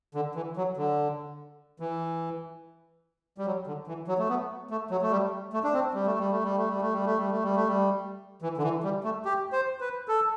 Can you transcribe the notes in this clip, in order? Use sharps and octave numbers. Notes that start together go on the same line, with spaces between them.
D3
E3
F#3
D3
E3
G3
F#3
D3
E3
F#3
A3
B3
A3
F#3
A3
G3
A3
D4
C4
G3
A3
G3
A3
G3
A3
G3
A3
G3
A3
G3
A3
G3
A3
G3
E3
D3
E3
G3
A3
G4
C5
B4
A4